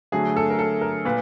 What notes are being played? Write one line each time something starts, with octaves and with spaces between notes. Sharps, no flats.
D3 F#3 A3 G#4
A4
A#4
A4
A#4
A#2 B4